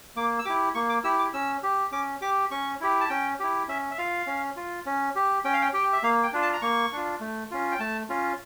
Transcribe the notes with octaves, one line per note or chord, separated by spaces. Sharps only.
A#3 D6
E6
E4 G4 D6
A#3 C#6
D6
E4 G4 E6
D6
C#4 E6
G4
C#4 D6
G4 D6
C#4 C#6
E4 G4
A5
C#4 G5
E4 G4
C#4 E5
E5
F4 F5
C#4
F4
C#4
G4
C#4 G5
F5
G5
G4 G5
E5
A#3 F5
G5
D4 F4
A5
A#5
A#3 C#6
D4 F4
A3
C#4 F4
G5
A3 A5
C#4 F4